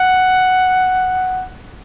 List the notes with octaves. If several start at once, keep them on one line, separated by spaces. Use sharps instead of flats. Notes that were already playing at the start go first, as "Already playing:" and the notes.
Already playing: F#5